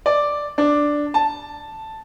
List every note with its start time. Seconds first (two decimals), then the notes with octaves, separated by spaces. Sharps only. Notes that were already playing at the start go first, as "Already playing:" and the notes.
0.06 D5
0.58 D4
1.14 A5